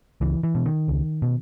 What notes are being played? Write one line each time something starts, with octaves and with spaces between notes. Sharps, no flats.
C#2 E3
E3
B2
D#3
C#2
B2